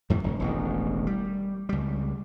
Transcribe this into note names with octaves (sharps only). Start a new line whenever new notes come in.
F2 A2 D#3 E3
F1
E1 A1 D#3
G3
C#2 G3